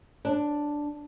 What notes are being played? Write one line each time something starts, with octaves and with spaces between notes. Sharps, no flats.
D4